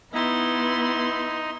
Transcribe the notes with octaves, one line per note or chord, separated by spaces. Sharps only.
B3 D#4 E4 C6